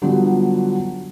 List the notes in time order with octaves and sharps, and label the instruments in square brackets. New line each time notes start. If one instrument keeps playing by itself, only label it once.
[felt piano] D3 F#3 G3 B3 F4 G4